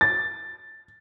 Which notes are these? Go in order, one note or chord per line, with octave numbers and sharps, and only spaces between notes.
A6